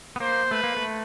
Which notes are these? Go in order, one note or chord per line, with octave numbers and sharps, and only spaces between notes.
B3
A#3 C5
A3 B4
A#3
A3